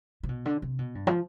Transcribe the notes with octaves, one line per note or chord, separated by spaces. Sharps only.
C3
B2
D3
C3
B2
G2
F3